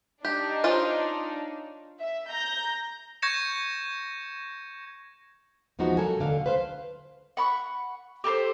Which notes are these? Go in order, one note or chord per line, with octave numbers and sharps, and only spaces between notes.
D4 D#4 G4
C#4 F4 C5
E5
A#5 G6 A#6
C#6 G6 G#6 A#6 C#7 E7
E2 F3 G#3 D#4 F#4 B4
C3 F#3 A4 A#4 G#5
D#2 D3 F5
B4 C5 F5
F#5 B5 C#6
G4 A4 A#4 C5